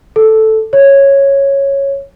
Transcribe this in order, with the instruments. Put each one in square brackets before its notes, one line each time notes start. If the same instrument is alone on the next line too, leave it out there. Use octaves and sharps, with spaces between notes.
[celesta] A4
C#5